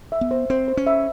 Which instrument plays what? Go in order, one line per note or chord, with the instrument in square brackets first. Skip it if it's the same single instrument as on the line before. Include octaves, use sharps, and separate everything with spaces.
[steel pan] E5
[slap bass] B3
[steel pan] C5
[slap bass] C4 [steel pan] C5
[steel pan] C5
[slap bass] C#4
[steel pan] E5